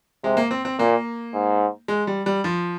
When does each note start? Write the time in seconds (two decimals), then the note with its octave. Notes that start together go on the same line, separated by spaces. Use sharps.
0.24 C3 G#3
0.37 A#3
0.51 C4
0.65 C4
0.79 A#2 A#3
1.34 G#2
1.88 G#3
2.07 G3
2.26 G3
2.44 F3